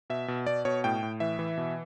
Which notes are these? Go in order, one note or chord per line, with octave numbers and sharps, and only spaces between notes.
B2 E5
B2
B2 D5
B2 C#5
A2 G5
A2
E3 E5
E3
B2